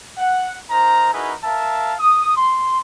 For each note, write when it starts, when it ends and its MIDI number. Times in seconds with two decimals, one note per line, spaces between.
0.18 0.56 78
0.70 1.12 63
0.70 1.12 70
0.70 1.12 72
0.70 1.12 82
1.13 1.33 63
1.13 1.33 64
1.13 1.33 66
1.13 1.33 68
1.13 1.33 70
1.13 1.33 71
1.44 1.94 70
1.44 1.94 76
1.44 1.94 77
1.44 1.94 81
2.00 2.32 87
2.37 2.78 84